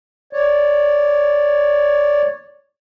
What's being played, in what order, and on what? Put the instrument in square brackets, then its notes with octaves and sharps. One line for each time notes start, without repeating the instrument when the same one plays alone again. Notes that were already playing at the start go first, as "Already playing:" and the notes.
[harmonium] C#5 D5